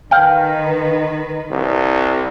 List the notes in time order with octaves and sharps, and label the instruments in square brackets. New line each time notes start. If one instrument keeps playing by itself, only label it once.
[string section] D#3 B4 [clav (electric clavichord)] F5 G5
[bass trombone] C2